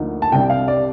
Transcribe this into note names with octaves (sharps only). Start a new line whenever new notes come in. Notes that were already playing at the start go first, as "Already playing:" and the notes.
Already playing: D2 D3 F3 A#3 D#4
A5
C2 C3 G3 D4 G5
F5
D5